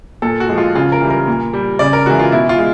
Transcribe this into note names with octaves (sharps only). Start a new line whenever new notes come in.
A#2 A4
F#4
F3 G#3
F4
C#3 F4
A#4
E3 G3
A#4
A#2
G3
C#3 D5
A#4
E3 G#3 F#4
F4
B2 E4
F4
G#3